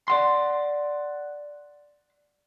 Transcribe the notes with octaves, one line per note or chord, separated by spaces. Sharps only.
D5 F#5 C6